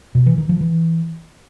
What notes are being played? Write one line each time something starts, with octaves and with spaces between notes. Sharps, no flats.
B2
E3
D#3
F3
E3